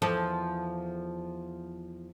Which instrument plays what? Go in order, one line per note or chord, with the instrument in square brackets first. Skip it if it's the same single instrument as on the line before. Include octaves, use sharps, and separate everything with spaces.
[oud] E2 F3 A4